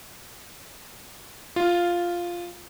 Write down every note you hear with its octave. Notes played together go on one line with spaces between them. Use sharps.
F4